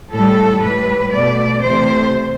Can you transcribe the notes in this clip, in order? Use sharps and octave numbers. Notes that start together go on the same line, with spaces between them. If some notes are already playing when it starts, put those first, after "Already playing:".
A2 G3 A4
A2 G3 B4
B2 A3 D5
C3 E3 A3 C5